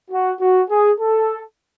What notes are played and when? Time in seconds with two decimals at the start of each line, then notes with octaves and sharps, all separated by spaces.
0.11 F#4
0.40 F#4
0.70 G#4
1.00 A4